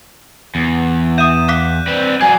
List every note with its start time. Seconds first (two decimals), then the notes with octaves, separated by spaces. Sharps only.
0.55 E2
1.18 E5 D#6 G6 D#7 E7
1.48 F5 D6 F#6 B6
1.87 C4 B4 D5
2.21 F#3 D5 G#5 G#6 C7